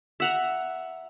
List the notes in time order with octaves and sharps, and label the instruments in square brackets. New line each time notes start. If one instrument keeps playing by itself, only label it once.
[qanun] E5 F#5 A#5